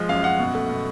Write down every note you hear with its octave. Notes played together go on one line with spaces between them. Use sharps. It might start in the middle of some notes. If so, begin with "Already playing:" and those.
Already playing: F3 G#3
F#2 F5
F#2 F#5
B2
A3
B2